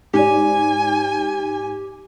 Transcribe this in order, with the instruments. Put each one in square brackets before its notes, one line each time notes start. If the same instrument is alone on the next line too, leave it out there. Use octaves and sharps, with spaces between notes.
[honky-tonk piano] G#2 D5 [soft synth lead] G4 [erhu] G#5